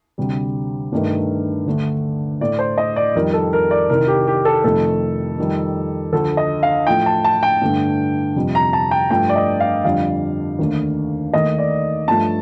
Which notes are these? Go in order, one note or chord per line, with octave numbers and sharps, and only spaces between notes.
D2 C3 G3
G2 D#3 A3
D2 D3 A3
A2 A3 D5
C5
D#5
D5
F2 D#3 G3 A#4
A4
A#4
D5
C2 C3 D#3 A#4
G4
G4
A4
F2 C3 D#3 A3 A4
F2 D#3 G3
D2 D3 F3 A4
D#5
F5
A2 F3 A3 G5
A5
A5
G5
G2 D3 A3
F2 C3 G3
A#5
A5
G5
G2 F3 A3 G5
D5
D#5
F5
F2 D3 G3 F5
D#2 D3 A3
D#2 D#3 A3 D#5
D5
G2 F3 A3 A5